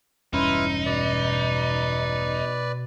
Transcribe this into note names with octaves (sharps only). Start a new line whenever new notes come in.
E1 G2 C#4 D#4 E4 B4 C6 F6
B2 B4 D5